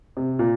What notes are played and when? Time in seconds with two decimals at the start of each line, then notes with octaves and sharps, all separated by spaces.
0.17 C3
0.39 A#2